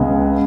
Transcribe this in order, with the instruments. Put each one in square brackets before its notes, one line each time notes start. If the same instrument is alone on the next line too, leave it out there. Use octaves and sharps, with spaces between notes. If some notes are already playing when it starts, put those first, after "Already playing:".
Already playing: [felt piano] C#2 C#3 G#3 B3